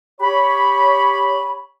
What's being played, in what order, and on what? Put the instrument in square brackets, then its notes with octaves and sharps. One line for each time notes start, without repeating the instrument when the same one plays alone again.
[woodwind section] G4 C#5 B5